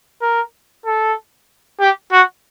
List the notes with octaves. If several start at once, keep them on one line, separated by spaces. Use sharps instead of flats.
A#4
A4
G4
F#4